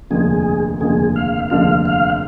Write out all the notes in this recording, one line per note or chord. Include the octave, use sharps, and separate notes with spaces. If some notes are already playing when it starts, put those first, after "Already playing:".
F1 D#2 D3 F3 G#3 G#4
F1 D#2 D3 F3 G#3 G#4
F5
F1 D#2 D3 F3 G#3 F5
F5